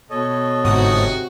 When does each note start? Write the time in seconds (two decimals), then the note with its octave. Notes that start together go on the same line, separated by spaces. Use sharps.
0.10 B2 A4 C#5 D#5
0.64 G1 G#2 C3 F#4 D#6